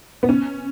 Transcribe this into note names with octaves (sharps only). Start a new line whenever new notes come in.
B3
C#4